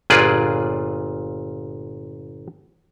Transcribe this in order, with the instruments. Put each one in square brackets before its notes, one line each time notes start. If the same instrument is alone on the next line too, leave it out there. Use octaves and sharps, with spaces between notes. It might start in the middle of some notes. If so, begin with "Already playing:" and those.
[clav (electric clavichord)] G1 A#2 F4 G#4 B4 D5